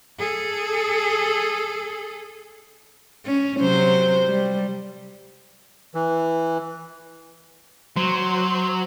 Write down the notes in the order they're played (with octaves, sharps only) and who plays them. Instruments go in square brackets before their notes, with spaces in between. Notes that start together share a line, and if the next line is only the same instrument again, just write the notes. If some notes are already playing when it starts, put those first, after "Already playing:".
[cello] G#4 A4
[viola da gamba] C#4
C3 F#3 C5
G3
[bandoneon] E3
[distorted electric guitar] F#3 [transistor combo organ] C5